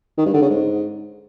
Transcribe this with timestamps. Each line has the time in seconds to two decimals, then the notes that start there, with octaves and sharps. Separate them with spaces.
0.17 D#3
0.25 G2
0.34 D3
0.42 C#3
0.50 G#2